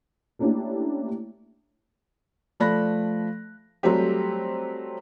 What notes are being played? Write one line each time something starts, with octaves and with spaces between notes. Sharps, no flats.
A3 A#3 C#4 D4 E4 G4
F3 A3 D5 B5 F#6 A#6
F#3 G3 A3 C4 G4